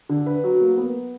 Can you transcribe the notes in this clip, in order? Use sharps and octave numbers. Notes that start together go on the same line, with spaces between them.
D3
B4
F#3
A#3
B3